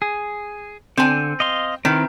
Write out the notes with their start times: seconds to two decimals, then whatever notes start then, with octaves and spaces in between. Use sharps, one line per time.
0.02 G#4
0.97 D3 C4 G#5
1.40 D#5 F5 C6
1.85 D#3 C4 E4 B4